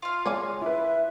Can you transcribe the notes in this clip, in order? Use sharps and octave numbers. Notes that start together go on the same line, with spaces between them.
F4 F5
G#3 C#5 D5 G#5
E4 B4 E5